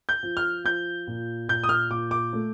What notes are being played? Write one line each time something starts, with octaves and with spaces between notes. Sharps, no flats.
G6
F3
F6
F3 G6
A#2
A#2 G6
D#6
F6
A#2 D6
D6
A3